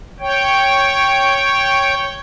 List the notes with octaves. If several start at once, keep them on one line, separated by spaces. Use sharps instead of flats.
C#5 G5